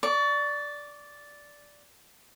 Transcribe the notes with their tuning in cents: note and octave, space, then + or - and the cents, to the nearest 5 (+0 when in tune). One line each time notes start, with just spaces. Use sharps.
D5 -5 C#6 +30